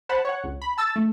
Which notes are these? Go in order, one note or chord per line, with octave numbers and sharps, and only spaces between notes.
C5 F#5 A5 B5
C#5 F#5
C#2
B5
A5 E6 A6
A3